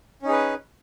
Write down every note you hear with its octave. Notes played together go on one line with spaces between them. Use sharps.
C#4 D#4 G#4 B4